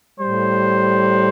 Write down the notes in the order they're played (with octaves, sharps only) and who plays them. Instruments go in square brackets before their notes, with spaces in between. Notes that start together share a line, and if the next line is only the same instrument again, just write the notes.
[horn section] A2 G3 C5